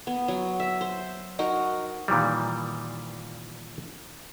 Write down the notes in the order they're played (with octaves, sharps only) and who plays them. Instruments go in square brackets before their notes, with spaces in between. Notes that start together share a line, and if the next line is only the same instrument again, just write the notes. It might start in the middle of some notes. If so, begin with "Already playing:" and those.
[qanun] B3
F#3
E5
C5
D#4 F#4 A#4
[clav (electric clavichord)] A#2 D#3 E3 G3